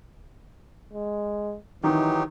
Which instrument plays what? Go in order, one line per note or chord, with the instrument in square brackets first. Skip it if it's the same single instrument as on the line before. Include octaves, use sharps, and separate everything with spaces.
[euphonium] G#3
[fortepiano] D#3 [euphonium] E3 [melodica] F#3 D#4 G4